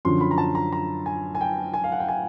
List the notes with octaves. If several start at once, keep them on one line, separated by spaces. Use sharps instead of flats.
F#2 D3 F3 C6
B5
A#5
A5
A#5
A#5
G#5
G#5
G5
G#5
F5
F#5
G5
G#5